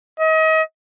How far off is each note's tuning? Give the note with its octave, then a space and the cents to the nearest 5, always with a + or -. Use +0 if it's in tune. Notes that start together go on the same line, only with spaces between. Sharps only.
D#5 +35